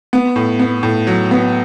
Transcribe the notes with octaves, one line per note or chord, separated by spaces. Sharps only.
B3
A2
B3
A2
F#3
B3